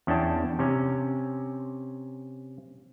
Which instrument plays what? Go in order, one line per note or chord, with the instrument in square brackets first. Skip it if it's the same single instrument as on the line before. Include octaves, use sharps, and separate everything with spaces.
[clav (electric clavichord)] E2 C#4 D4 G5 A5
C3 C#4